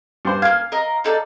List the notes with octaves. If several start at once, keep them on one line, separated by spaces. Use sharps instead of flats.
G2 C5
A#3 F5 G#5
A#4 D#5
D#4 A4 D5